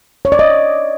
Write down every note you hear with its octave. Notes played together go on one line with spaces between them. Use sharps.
C#5
D5
D#5